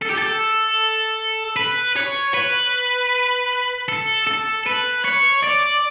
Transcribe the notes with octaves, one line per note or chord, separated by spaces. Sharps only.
A4
G4
A4
B4
C#5
B4
A4
A4
B4
C#5
D5